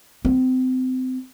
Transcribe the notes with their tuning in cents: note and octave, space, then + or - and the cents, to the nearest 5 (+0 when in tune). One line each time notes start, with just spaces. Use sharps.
C4 -30